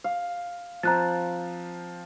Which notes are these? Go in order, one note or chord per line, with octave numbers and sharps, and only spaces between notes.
F5
F3 C4 A#5 F#6 A6